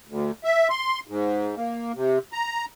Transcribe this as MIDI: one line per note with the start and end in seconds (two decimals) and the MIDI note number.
0.07 0.31 38
0.44 0.68 76
0.70 1.00 84
1.07 1.55 44
1.57 1.92 58
1.94 2.18 48
2.33 2.65 82